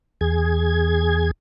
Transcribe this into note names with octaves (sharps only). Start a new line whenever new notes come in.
E2 G#4 G#6